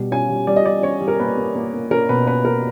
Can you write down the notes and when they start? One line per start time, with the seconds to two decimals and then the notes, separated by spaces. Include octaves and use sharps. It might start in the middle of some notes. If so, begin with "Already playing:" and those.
Already playing: B2 G3
0.11 C#4 G#5
0.30 G3
0.47 G3 D5
0.56 D#5
0.66 G3 D5
0.83 C#4 C#5
1.01 G3
1.08 A#4
1.20 A#3 B4
1.37 A#3
1.55 A#3
1.73 A#3
1.91 C#4 A#4
2.09 B2 B4
2.27 C#4 B4
2.45 A#3 A#4